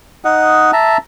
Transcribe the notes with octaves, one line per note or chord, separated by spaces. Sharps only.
D#4 D#5 F#5
E5 A5 A#5